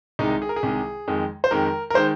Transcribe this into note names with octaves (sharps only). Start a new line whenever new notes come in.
C2 C3 D#3 G#3 D#4
G#4
A#4
G#4
C2 C3 D#3 G#3
F2 D#3 G#3
C5
F2 D#3 G#3 A#4
A#4
D#3 G#3 C5